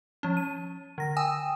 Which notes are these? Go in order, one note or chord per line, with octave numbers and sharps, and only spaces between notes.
F3 C#4
D#7
D3 A#6
G5 G#5 D#6 E6